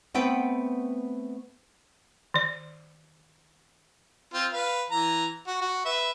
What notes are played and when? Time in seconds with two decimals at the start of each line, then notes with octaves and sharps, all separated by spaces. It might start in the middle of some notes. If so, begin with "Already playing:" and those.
0.14 A3 B3 C4 B4 F#5 G5
2.34 D#3 D5
4.33 C4 F4
4.53 B4 F5
4.91 E3 A#5
5.47 F#4
5.61 F#4
5.85 B4 E5